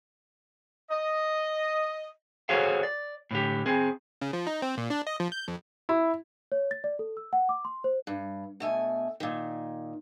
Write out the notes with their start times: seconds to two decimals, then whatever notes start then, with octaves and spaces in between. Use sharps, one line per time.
0.91 D#5
2.49 F#4 G#4 A4 C5 C#5 F5
2.83 D5
3.31 A2 D3 G4
3.66 C4 G#4
4.22 C#3
4.33 F3
4.47 D#4
4.62 C4
4.77 A#2
4.90 D4
5.07 D#5
5.20 F3
5.32 G6
5.48 F2
5.89 E4
6.52 C#5
6.71 A6
6.84 D5
6.99 A4
7.17 E6
7.33 F#5
7.49 D6
7.65 C6
7.84 C5
8.07 G2
8.60 B2 A3 G#5
9.20 A#2 D#3